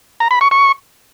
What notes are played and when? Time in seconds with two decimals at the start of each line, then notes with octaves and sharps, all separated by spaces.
0.20 A#5
0.31 B5
0.41 C#6
0.51 C#6